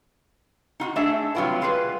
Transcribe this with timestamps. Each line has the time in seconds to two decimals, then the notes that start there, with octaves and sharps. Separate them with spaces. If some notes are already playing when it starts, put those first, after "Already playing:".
0.80 D#4 F4 F#4
0.96 A3 D4 D#4 G#4 E5
1.35 C3 F#3 G3 F4 G4 B4
1.61 G3 F4 G#4 A4 B4